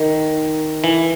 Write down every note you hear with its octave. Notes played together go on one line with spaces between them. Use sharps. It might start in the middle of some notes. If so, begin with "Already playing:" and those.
Already playing: D#3
E3